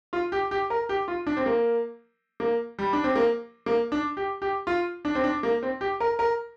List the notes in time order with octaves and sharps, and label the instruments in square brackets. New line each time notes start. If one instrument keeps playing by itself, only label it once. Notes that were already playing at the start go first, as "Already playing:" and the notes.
[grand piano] F4
G4
G4
A#4
G4
F4
D4
C4
A#3
A#3
G3
D4
C4
A#3
A#3
D4
G4
G4
F4
D4
C4
D4
A#3
C4
G4
A#4
A#4